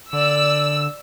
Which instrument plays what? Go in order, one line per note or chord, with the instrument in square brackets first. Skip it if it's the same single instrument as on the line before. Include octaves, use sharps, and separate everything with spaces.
[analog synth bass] D3 [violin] D5 [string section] E6